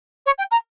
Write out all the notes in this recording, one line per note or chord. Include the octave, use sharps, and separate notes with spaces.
C#5
G5
A#5